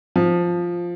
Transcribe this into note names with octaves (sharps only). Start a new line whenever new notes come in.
F3